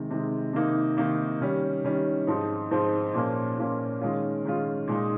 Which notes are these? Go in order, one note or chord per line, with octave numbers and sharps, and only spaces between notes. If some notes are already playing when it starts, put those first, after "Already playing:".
Already playing: C3 D#3 G#3
C3 D#3 G#3
C3 D#3 A#3 D#4
C3 D#3 A#3 D#4
D#3 G3 C#4
D#3 G3 C#4
G#2 F3 C4 D#4
G#2 F3 C4 D#4
A#2 F3 A#3 C#4
A#2 F3 A#3 C#4
D#3 G#3 C#4 F4
D#3 G#3 C#4 F4
A#2 G#3 D#4